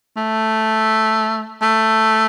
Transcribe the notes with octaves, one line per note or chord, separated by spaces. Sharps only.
A3
A3